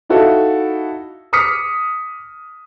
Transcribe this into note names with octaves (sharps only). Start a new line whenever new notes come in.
D#4 E4 F#4 A4 F5
D6 D#6 F6 B6 C#7